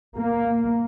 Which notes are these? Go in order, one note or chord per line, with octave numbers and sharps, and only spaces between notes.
A#3